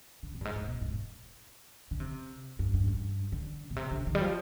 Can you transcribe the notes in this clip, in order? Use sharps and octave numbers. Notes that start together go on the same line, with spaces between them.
D3
C3
G2
G#2
G#2
B2
G#2
D3
C3
G2
G2
G2
D3
B2
C3
D3
D#3
G3
F3